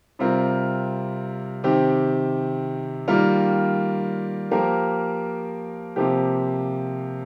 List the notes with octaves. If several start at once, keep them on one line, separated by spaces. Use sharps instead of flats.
C3 G3 C4 F4 A#4
C3 D#3 C4 G4
D#3 G3 A#3 F4 A#4
F3 A#3 G4 A#4
C3 F3 A#3 G4